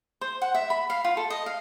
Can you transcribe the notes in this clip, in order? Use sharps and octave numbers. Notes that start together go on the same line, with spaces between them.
C5
F#5
E5
B5
F5
F4
A4
D#5
F5